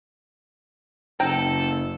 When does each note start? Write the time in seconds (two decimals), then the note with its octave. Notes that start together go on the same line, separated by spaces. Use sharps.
1.20 F#1 A4 G5 A#5